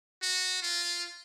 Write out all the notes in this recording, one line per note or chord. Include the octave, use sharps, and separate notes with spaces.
F#4
F4